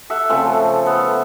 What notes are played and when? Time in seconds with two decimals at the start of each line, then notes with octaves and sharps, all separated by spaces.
0.10 A4 E5 F#5
0.29 C#3 F3 A3 C4
0.86 B3 A4